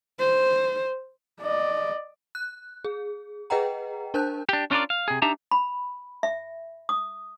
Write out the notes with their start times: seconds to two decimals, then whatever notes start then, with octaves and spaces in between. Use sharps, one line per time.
0.19 C5
1.41 D5 D#5
2.35 F#6
2.85 G#4
3.50 G#4 B4 D#5 F#5 G5 A#5
4.14 D4 A#4 C5 A5 F#6 G6
4.49 D4 G4
4.71 C#4 D4 F4 F#4 A#4 D5
4.90 F5
5.08 C3 G#4
5.22 D4 D#4 G4 E5 A5 A#5
5.51 B5
6.23 E5
6.89 D#6